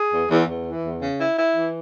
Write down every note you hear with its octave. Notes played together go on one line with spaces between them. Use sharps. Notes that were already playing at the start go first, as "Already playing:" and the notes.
Already playing: G#4
E2
E2
E2
E3
E2
C#3
E4
E4
E3